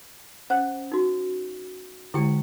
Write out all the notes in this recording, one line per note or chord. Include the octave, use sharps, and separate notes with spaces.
C#4 C5 F#5 F#6
D#4 F#4
D3 G#3 E4 G4 G5